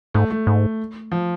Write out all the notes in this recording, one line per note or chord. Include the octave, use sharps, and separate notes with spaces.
G#2 A3
A3
G#2
F3